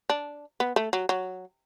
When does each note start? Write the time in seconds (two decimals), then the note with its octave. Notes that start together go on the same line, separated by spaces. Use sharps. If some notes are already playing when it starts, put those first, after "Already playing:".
0.09 D4
0.60 B3
0.76 A3
0.93 F#3
1.09 F#3